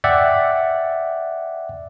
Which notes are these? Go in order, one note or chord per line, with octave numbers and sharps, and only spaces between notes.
D5 E5 F#5 G5